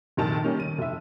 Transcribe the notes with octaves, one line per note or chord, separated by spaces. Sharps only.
F1 A#1 D#3 A5
D#3 G3 A#3 C#4
D#7
F1 E5